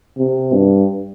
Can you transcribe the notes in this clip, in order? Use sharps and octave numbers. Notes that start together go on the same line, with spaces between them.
C3
G2